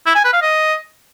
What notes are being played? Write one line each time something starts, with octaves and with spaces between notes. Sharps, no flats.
E4
G#5
B4
F5
D#5